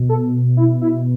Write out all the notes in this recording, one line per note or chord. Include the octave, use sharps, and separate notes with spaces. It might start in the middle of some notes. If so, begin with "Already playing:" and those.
Already playing: B2
A4
E4
E4